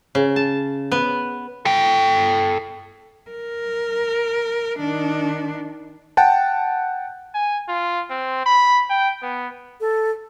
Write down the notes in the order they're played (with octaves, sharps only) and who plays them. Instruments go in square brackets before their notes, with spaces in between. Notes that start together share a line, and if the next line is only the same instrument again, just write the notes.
[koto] C#3
A5
B3
[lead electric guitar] A4 G5
[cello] A#4
D#3 D4
[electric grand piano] F#5 G5 A5
[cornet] G#5
F4
C4
B5
G5
B3
[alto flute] A4